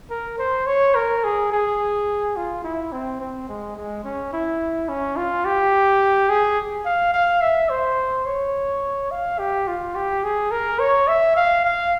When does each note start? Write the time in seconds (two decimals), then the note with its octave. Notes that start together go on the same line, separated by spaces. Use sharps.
0.10 A#4
0.38 C5
0.66 C#5
0.95 A#4
1.24 G#4
1.52 G#4
2.36 F4
2.64 E4
2.92 C4
3.20 C4
3.49 G#3
3.77 G#3
4.04 C#4
4.33 E4
4.89 C#4
5.17 F4
5.45 G4
6.29 G#4
6.85 F5
7.14 F5
7.42 E5
7.70 C5
8.26 C#5
9.11 F5
9.39 G4
9.67 F4
9.95 G4
10.24 G#4
10.51 A#4
10.79 C#5
11.08 E5
11.37 F5
11.64 F5